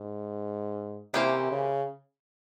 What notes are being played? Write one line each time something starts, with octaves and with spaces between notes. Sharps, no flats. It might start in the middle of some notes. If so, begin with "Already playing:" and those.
Already playing: G#2
C3 E3 A#3 C#4 G4 C5
C#3